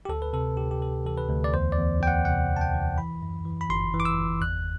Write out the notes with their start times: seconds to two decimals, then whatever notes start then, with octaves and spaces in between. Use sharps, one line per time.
0.05 G4
0.09 D2 A4
0.22 B4
0.33 C3 A4
0.57 D2 G4
0.71 G4
0.81 C3 A4
1.05 E3 A4
1.18 B4
1.29 D2
1.44 D5
1.53 E2 C5
1.72 D5
1.77 E2
2.01 E2 G5
2.07 F#5
2.25 C3 F#5
2.50 E2
2.56 A5
2.61 G5
2.74 E3
2.98 E3 B5
3.22 F#2
3.45 E3
3.61 B5
3.69 G1 C6
3.94 E3
4.00 D6
4.05 E6
4.18 G1
4.41 E2 F#6